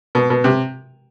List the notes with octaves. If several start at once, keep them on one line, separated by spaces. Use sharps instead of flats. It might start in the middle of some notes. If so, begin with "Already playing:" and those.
B2
B2
C3